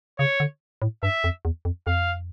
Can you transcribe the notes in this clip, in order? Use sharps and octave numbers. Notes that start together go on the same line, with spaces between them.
C#3 C#5
D3
A2
G2 E5
F2
E2
F2
F2 F5